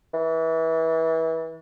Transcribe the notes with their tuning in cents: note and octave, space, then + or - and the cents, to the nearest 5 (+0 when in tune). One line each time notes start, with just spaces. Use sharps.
E3 -25